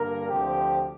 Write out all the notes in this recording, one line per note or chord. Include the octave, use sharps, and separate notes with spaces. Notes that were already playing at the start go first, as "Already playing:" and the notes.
Already playing: G2 D3 A#3 A#4
D2 C3 F3 C4 G4